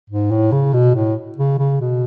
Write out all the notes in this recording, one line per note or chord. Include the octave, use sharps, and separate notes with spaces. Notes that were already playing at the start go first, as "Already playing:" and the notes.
G#2
A2
C#3
B2
A2
C#3
C#3
B2